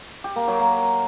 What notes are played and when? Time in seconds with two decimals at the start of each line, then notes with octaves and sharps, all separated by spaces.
0.24 G4
0.36 A#3
0.48 F#3
0.59 A#3